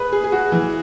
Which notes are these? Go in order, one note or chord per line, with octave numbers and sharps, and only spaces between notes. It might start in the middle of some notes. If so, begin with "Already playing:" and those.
Already playing: G#4 B4
G#4
G#4
F#4
E3